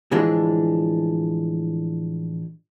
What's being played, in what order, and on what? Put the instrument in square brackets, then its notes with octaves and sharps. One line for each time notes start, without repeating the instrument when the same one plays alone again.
[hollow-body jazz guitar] A2 D3 E3 F3 G#3 D4